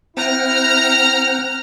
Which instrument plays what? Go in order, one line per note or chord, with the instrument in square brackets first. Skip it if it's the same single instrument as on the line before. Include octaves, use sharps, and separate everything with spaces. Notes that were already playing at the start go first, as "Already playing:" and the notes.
[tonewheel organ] C4 F#5 G5 [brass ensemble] E4 [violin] A#5 F6